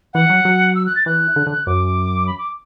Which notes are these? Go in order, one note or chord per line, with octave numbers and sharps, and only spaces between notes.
E3 F#5
F#3
F#3
E6
F#6
A6
E3 F#6
D3
D3
F#2 D6
B5
D6